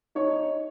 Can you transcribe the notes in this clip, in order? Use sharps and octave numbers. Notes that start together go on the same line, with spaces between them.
D#4 C#5